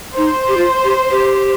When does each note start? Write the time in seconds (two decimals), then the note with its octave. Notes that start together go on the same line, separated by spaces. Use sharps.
0.17 D#4 C5
0.48 G4
0.57 F4
0.84 G4
1.11 G4